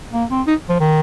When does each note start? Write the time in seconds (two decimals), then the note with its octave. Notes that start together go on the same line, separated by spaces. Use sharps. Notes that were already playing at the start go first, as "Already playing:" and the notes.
0.13 A#3
0.30 C4
0.47 D#4
0.69 F3
0.80 D#3